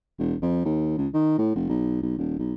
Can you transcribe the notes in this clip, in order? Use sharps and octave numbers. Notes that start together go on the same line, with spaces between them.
E1
F2
D#2
C#2
D#3
A2
F1
B1
B1
D#1
B1